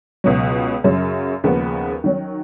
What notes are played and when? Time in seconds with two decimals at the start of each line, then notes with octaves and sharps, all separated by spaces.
0.24 C#2 B2 F#3
0.84 F#2 C#3 F#3
1.44 D#2 C#3 F3 G#3 B3
2.04 D#3 F#3 C#4